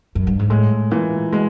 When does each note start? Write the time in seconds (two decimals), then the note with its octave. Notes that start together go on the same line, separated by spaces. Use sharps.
0.15 F#2
0.27 G2
0.39 G#2
0.50 A2 G#3
0.91 A#2 E3
1.32 B2 G#3